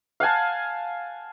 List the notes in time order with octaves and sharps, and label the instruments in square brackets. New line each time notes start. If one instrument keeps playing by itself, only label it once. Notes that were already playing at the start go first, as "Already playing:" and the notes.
[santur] F5 F#5 G#5 A5